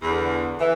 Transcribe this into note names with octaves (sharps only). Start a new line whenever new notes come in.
E2 D3
E3